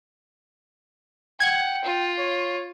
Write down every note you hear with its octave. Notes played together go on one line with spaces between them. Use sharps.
F#5 G5 G#6
F4
C#5